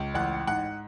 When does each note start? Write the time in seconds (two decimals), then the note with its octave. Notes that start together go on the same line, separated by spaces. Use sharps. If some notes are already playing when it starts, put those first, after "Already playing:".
Already playing: C#2
0.14 A1 F#5
0.47 G#2 F#5